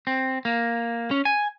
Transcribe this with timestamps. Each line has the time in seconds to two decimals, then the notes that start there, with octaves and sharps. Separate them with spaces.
0.07 C4
0.45 A#3
1.11 C#4
1.25 G#5